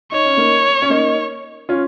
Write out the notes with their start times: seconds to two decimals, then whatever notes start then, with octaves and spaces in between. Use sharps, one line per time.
0.12 D#4 C#5
0.25 C#4
0.37 A#3 D#4
0.82 C#4
0.90 A#3 D#4
1.69 C#4 F4